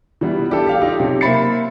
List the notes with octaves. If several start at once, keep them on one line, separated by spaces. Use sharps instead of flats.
E3 G3 B3
D4 G4 A4
G4 F5 G5
D#4 F4 G4
B1 C3
A#3 C5 E5 B5 A6 C#7